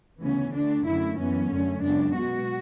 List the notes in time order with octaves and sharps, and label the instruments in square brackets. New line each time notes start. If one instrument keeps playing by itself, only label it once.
[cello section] D2 C#3 E3 B3 C#4
D2 D3 A3 D4
F#2 D3 A3 E4
F#2 E3 B3 C#4
F#2 D3 A3
F#2 C#3 G#3 B3 D4
B2 G#3 B3 F#4